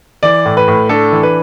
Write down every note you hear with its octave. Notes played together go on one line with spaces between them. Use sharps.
E3 D5
A2
B4
A2
D4 A4
E3
B4